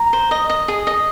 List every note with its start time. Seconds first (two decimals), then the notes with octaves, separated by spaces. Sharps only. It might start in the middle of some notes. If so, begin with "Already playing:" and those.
Already playing: A#5
0.13 C5
0.31 D#5
0.49 D#5
0.68 G#4
0.87 D#5